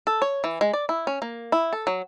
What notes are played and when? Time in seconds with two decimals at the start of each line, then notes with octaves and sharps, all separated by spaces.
0.07 A4
0.22 C#5
0.44 E3
0.61 G#3
0.73 D5
0.89 E4
1.07 C#4
1.22 A#3
1.52 E4
1.73 A4
1.87 F#3